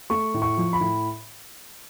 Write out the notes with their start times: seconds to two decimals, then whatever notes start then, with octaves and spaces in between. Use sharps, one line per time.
0.10 A3 C#6
0.34 A2
0.42 C#6
0.57 F3
0.73 B5
0.80 A2